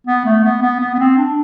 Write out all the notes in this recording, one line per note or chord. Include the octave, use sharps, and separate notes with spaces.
B3
A3
B3
B3
B3
B3
C4
D4